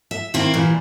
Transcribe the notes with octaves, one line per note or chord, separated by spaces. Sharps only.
E5
D#3 A#3 C4 E4
A#2 E3 G3